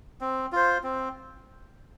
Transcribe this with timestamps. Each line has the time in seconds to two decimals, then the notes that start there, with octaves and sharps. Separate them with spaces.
0.21 C4
0.52 F4 C5
0.83 C4